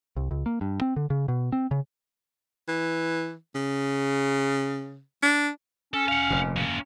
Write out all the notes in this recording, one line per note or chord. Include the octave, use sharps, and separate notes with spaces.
C2
C#2
A#3
G2
C4
D3
C#3
B2
C4
C#3
E3
C#3
D4
C#4 A4
F5 F#5
F1 A#2
A#3 C#4